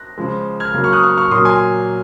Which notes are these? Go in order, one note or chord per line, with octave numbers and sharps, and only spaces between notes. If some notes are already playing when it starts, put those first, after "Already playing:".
Already playing: F#6 A#6
C#3 F3 G#3
F6 G#6
C#3 F#3 A#3
C#6 F6
D#6 F#6
C#6 F6
C#6 F6
A#2 F#3 A#3 C6 D#6
G#5 C6